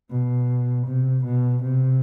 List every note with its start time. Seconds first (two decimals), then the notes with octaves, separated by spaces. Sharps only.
0.11 B2
0.87 C3
1.25 B2
1.63 C3